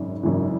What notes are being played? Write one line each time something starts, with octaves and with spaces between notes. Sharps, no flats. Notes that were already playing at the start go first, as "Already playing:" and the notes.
Already playing: G#1 F#2 C#3
G#1 F#2 C#3 E3